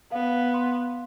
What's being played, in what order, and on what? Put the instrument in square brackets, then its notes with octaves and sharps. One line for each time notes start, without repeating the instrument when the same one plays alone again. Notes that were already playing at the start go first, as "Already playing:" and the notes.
[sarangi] B3 [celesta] F5
[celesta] C6